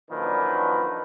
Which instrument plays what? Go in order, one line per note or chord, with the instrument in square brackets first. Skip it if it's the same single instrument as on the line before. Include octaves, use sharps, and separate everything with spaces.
[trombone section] F#2 A#2 D3 D#3 F3 B4